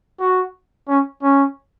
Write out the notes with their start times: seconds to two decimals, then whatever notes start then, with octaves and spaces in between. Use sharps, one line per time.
0.20 F#4
0.88 C#4
1.22 C#4